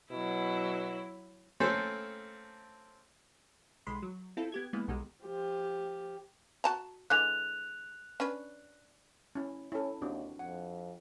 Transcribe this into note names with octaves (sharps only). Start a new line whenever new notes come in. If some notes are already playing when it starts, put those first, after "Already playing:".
B2 F#3 E4
A3 A#3 C4 C#4 A4 C5
B1 D#3 G#3 B5 C6
F#3
C4 E4 F4 A4
B3 G4 G#6
E3 G#3 A#3 B3
B1 B2 D#3 G3 G#3
F3 G4
F#4 A5 A#5
D3 E3 G#3 F#6 F7
C#4 D4 B4
C#4 E4
C#4 E4 A4
D#2 C4 D4 F#4
F2 F#5